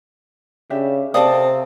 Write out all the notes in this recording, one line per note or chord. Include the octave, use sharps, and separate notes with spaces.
C#3 D4 G4 E5
C3 C4 A4 A#4 D5 F5 A5 D#6